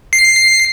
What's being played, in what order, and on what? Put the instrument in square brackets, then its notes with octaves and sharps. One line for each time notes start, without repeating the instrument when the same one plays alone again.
[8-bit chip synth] C7